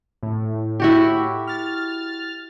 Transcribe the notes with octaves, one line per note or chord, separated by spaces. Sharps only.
A2
E4 F#4 G4
F6 A6